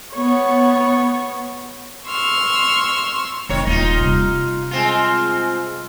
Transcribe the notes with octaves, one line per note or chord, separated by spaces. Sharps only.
B3 C#5
C6 C#6 E6 F6
F1 D#3 C#5
D#1 D#4 F4
C3 G3
G#3 C4 F4